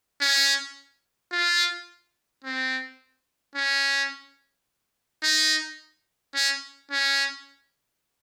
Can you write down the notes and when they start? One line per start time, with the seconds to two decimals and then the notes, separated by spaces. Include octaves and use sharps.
0.21 C#4
1.32 F4
2.44 C4
3.55 C#4
5.23 D#4
6.35 C#4
6.91 C#4